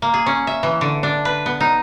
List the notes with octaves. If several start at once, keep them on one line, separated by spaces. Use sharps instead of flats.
A#3
G#4
C#4
E5
E3
D3
D4
B4
B3
D#4